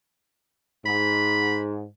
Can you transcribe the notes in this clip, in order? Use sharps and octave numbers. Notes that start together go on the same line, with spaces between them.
G#2 B5